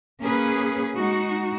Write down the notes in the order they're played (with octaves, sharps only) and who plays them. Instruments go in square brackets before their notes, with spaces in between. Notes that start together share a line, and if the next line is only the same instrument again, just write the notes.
[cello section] A#3 C#4 G#4 B4
G#3 D#4 F#4